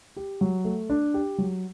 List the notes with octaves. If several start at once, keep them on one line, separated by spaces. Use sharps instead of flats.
G4
F#3
A3
D4
G4
F#3